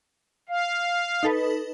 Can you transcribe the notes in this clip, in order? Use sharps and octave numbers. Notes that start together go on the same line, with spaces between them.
F5
D#4 A4 B4